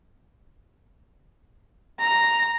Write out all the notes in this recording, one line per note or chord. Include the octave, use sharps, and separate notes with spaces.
A#5